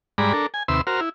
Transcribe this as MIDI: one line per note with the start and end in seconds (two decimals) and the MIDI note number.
0.18 0.33 44
0.18 0.33 55
0.18 0.33 56
0.18 0.33 74
0.18 0.33 82
0.18 0.33 83
0.33 0.46 62
0.33 0.46 69
0.33 0.46 70
0.54 0.63 80
0.68 0.81 39
0.68 0.81 48
0.68 0.81 71
0.68 0.81 76
0.68 0.81 84
0.68 0.81 88
0.87 1.00 66
0.87 1.00 70
0.87 1.00 72
0.87 1.00 89
1.01 1.09 64